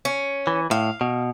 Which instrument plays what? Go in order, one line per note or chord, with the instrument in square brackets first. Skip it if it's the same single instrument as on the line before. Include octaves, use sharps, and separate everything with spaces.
[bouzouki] C#4
[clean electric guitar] E3
[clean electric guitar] A2 [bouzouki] F5
[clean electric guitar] B2